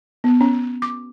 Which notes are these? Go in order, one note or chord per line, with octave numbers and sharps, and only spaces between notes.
B3
C#4
D6